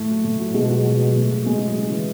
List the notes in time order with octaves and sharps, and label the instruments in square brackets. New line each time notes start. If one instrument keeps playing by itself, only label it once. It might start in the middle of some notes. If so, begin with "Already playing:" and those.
Already playing: [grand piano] A2 A3
F#3
A2
F#3
B2 G#3 G#4
F#3 F#4
B2
F#3
A2
F#3
A2 G#3 G#4
F#3
C#3
E3